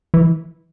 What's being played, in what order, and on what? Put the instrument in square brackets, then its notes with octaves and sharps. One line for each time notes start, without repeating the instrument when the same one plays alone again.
[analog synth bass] E3